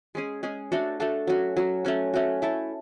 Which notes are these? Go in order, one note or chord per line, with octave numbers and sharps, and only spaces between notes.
G#3 C#4 G#4
G#3 C#4 G#4
A3 D4 F#4 A4
A3 D4 F#4 A4
F#3 C#4 F#4
F#3 C#4 F#4
A3 C#4 F#4
A3 C#4 F#4
A3 E4 A4